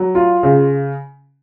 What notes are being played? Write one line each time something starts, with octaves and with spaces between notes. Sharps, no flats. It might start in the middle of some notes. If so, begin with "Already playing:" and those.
Already playing: F#3
F4
C#3